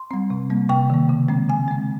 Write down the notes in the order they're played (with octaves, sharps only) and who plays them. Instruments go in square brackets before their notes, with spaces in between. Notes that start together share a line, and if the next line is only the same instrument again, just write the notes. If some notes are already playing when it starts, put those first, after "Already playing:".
Already playing: [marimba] C6
G3 C4
C3
G3 A#3
C3 G5
D#3 A#3
C#3
G#3 C4
C#3 G#5
G#3 C4